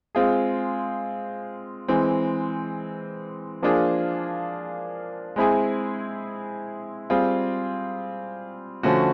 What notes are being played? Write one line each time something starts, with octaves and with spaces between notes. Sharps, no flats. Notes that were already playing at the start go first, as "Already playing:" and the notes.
G#3 C4 F4 G#4
E3 G#3 C4
F3 A#3 D4 F4 G#4
G#3 C4 E4 G#4
G3 C4 F4 G#4
D3 F3 A3 C#4 F#4